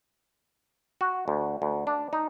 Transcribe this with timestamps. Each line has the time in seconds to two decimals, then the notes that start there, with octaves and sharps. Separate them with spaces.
1.01 F#4
1.28 D2
1.62 D2
1.87 D4
2.13 D#4